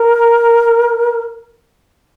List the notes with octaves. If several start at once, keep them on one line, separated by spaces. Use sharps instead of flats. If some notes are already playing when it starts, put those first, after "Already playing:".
Already playing: A#4